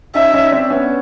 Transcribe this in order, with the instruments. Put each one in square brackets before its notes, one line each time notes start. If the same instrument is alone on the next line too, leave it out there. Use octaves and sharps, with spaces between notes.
[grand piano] C#4 D#4 [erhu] E5
[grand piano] C#4 D#4
C4 D4
B3 C#4